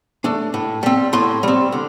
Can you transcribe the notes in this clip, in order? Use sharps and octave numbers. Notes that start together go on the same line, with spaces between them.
A3 D4
A2
G3 C4
A2 C6
G3 C4
D3